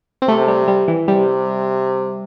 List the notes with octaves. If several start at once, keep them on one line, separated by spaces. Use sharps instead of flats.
C4
C3 A3
G3
G3
E3
C3 G3